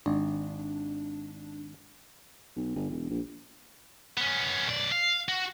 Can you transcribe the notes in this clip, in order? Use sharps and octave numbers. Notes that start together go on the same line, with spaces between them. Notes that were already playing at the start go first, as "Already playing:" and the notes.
G#1 D4
B1
G1
E1
A#1
B3 C#4
B1 D5
F5
F#4